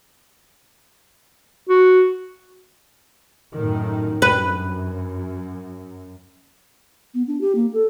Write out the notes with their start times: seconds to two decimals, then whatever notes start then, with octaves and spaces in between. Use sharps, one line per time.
1.69 F#4
3.54 F#2 A2 D#3
4.22 F#2 B4
7.14 B3
7.27 D4
7.41 G4
7.55 A#3
7.73 A4